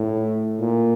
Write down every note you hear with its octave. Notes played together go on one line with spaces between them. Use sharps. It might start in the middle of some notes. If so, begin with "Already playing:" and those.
Already playing: A2
A#2